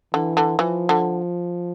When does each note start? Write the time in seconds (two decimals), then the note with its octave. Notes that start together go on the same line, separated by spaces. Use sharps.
0.14 D3 E3
0.37 D3
0.59 E3 F3
0.89 D3